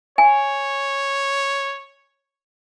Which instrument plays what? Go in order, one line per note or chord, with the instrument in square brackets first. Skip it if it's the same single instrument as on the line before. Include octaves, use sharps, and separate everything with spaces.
[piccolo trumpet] C#5 [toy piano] G#5